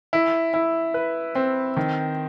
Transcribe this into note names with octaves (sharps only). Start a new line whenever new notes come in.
E4
E4
B4
C4
D#3